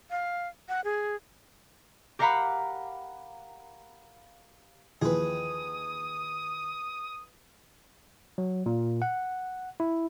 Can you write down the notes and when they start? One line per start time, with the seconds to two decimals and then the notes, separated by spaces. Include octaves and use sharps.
0.11 F5
0.69 F#5
0.84 G#4
2.19 G4 A#4 F5 F#5 A#5 B5
5.02 D#2 E3 F3 G#4 B4 D#6
8.38 F#3
8.66 A#2
9.02 F#5
9.80 E4